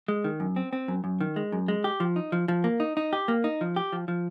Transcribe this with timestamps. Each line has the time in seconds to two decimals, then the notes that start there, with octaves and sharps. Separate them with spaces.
0.08 G#3
0.24 D#3
0.40 F#2
0.56 C4
0.73 C4
0.88 F#2
1.04 F#2
1.21 D#3
1.36 G#3
1.52 F#2
1.68 G#3
1.84 G4
2.00 F3
2.16 D#4
2.32 F3
2.48 F3
2.64 A#3
2.80 D#4
2.97 D#4
3.13 G4
3.28 A#3
3.44 D#4
3.61 F3
3.76 G4
3.93 F3
4.08 F3